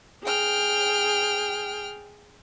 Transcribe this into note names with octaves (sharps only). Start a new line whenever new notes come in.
G#4 G5 F6